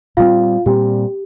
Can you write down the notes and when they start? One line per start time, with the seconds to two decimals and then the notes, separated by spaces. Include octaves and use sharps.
0.17 A#2 G3 C4 F4 F5
0.66 A#2 G3 C4 G4